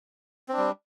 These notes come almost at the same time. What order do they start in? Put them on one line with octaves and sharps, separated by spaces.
C4 D4 G3